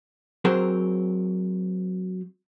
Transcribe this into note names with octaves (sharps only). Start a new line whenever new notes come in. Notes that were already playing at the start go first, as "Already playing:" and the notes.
F#3 C4 G#4 A#4 C5